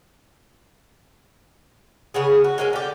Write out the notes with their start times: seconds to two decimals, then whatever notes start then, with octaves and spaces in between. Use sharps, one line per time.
2.14 C#3 B3 G#4
2.44 F#4
2.58 G#3 A#3 C#4
2.73 D3 G4